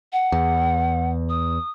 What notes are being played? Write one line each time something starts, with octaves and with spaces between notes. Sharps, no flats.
F#5
E2
D#6